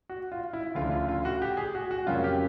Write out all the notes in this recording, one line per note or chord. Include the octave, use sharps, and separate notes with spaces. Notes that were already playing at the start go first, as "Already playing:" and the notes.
F#4
F4
E4
D2 C#3 F3 A3 D4 F4
F4
F4
F#4
G4
G#4
F#4
F#4
F2 C#3 F#3 A#3 C#4 F4
G4